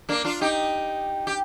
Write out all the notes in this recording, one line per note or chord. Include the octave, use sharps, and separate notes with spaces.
A#3 D4
D4 F4
D#4 G4
G4